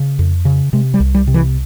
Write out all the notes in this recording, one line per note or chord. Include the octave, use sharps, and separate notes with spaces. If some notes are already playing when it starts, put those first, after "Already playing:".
Already playing: C#3
F2
C#3
C3 G#3
G3
C2
G3
C3
E3